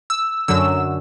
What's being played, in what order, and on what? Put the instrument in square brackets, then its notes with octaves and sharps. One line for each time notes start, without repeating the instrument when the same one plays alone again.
[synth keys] E6
F#2 D3 F#3 E6